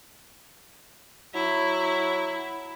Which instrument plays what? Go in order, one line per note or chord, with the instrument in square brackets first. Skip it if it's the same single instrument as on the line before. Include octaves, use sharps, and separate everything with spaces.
[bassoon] F#3 [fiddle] E4